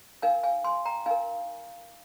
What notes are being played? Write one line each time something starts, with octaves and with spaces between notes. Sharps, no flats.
D#4 A#4 F5 G#5
F5 G#5
G#5 C6
G5 A#5
D#4 A#4 F5 G#5